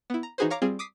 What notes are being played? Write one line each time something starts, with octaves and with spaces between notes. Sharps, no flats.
B3 E4
A#5
E3 D#4 F#4 G#4 B4 C5
C#5 F5 A#5 D6
G3 C4 F4 G#4
D6 D#6 B6 C7